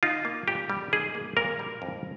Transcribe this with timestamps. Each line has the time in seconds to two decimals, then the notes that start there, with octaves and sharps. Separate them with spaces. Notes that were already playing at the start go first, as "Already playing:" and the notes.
0.03 D#4 F4
0.25 A#3
0.48 A#2 G4
0.70 G3
0.93 D#4 G#4
1.15 A#3
1.37 A#2 A#4
1.59 G3
1.82 F2